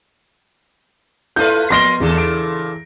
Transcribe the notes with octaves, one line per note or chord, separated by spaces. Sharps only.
A3 E4 F4 A4 B4 D5 G6
F3 B3 A#4 D#5 C6 A#6 G7
E2 A#2 C#3 E3 G#4 A4
D7